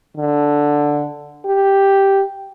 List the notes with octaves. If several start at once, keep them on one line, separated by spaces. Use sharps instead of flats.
D3
G4